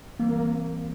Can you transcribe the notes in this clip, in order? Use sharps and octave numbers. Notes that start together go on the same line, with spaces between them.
E3 G3 A#3 C4